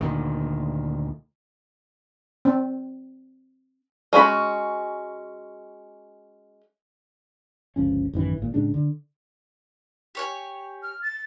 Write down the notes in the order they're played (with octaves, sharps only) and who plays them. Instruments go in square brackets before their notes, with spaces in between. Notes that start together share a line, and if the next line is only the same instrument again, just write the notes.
[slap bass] D2 A#2 D#3
[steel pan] C4
[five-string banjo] G#3 C#4 F#4 B5
[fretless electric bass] G1 C#2 F3 C#4
A1 F#2 D#3 E3
G#1 A#2
A2 C#3 G#3 D4
D3
[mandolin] G4 C#5 G#5
[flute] F6
A6